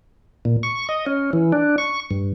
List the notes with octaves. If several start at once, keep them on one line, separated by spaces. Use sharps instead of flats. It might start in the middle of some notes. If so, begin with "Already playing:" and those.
A#2
C#6
D#5
C#4
E3
D4
C#6
G2